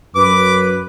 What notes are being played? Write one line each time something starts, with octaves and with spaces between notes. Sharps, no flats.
F#2 B4 D6